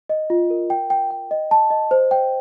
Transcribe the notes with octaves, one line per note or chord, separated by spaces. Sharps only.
D#5
F4
A#4
G5
G5
G5
D#5
A5
D#5
C5
G5